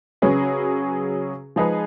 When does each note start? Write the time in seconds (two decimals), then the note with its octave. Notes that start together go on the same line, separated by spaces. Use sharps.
0.22 C#3 F#3 C#4 G#4 B4
1.56 F3 G#3 D#4 G#4 B4